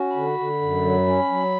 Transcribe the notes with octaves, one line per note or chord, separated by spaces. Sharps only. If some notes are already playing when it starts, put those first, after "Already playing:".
Already playing: C#4 F#4
D3 B5
D3
F#2
F#3
C#4
F#3